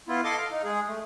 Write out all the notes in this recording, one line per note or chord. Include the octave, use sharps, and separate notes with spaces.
B3 E4 F4
A4 D#5 C6 D6
F5
D#4
G#3 G#4
A3